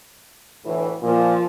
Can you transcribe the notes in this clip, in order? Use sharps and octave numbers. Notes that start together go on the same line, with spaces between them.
D2 A2 E3
A#2 F3